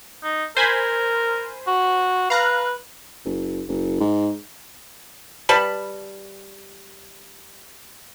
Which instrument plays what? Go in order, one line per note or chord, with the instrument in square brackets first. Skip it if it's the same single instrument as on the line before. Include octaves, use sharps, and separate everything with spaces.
[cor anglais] D#4
[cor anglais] A#4 [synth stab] C5 G#5 B5
[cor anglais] F#4
[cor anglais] B4 [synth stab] F5 A#5 F#6
[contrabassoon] F#1
F#1
G#2
[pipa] G3 B4 A5 B5